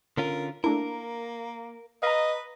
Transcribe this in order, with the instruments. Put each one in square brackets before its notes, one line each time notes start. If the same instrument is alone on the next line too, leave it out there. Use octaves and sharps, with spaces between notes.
[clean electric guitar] D3 C#4 F4 [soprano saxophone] A#4
[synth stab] A3 D4 E4 [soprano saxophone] A#3 [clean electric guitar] A#4
[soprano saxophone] B4 [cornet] D#5 [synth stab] F5 A#5